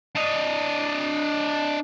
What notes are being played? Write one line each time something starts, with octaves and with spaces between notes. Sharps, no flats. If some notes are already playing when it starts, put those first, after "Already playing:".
D4 D#5